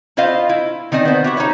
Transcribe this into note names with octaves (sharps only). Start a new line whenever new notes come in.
E4 F4 C5 D#5 F5
E4
D#3 C4 D5 D#5 G#5
B3 C5
E4 F#4 G4
D#4 C5 C#5